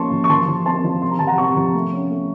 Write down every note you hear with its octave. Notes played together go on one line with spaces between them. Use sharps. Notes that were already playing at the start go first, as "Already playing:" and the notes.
Already playing: F3 A#3 C#4 A5 C6 C#6
F3
C#6
F3 A5 C6
F3
C4 A5 C6
F3
C3 C6
A#5
F3 A5
F#5 A#5
C3 A#5 C#6
F3
A3
C#4
A3